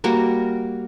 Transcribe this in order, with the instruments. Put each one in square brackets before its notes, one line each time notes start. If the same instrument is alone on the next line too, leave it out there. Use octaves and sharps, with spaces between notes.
[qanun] G3 A#3 F#4 A#4